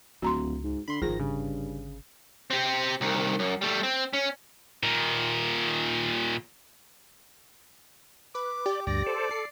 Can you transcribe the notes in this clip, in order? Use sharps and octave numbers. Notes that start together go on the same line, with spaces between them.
D1 C#2 F#4 A#5 C6
G#2
D3 B5 C6
G#1 D3 D#3 F3 G#4 A#6
G2 C#3
C4 G4
C2 D#3
F#2
G3 A3
C4
C#4
A#2 D#3
B4 D6
G4 D5
D2 G2 D5 A#6
A4 C5
A4 C7